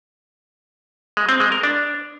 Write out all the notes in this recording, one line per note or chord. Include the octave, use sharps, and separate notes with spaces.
G#3
C4
G#3
A#4
D4